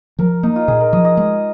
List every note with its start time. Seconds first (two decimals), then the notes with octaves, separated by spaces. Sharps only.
0.19 F3 A#4
0.43 A#3 D#4
0.56 F4
0.68 A#2 G#4
0.80 A#4
0.93 F3 D#5
1.05 D#5
1.17 G#3